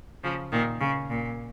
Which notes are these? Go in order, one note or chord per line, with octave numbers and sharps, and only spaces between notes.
C#3 F3
A#2 D#3
C#3
A#2